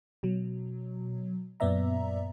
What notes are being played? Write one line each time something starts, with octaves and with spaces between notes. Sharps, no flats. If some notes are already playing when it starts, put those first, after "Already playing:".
B2 F#3
F#2 A#2 B3 D5 E5 A#5